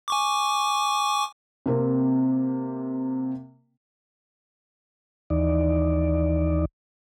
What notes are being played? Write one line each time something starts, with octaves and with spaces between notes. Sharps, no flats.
G#5 C#6 D6
C3 A#3 C4
D#2 E3 D#4 D5